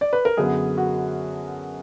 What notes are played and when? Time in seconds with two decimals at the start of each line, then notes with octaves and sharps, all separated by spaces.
0.01 D5
0.13 B4
0.25 A#4
0.37 F#2 D3 F#3 B3 G#4
0.78 F#4